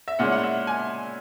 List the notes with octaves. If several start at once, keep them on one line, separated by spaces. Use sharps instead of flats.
E5
A#2 G#3 C#4 E4 F#5
F#5
E5
G#5